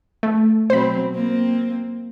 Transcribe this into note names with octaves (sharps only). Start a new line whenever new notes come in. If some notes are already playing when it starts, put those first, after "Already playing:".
A3
B2 F#3 C4 C5 B5
A#3 C4